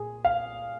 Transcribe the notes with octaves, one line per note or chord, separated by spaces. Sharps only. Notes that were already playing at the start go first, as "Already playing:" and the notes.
Already playing: A#2 G#4
F5